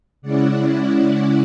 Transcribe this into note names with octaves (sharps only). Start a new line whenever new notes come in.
C#3 G#3 C#4 E4 D5 F#5